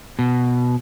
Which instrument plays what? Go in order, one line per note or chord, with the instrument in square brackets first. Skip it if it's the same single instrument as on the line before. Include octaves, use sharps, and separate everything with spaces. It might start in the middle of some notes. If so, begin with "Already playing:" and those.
[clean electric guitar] B2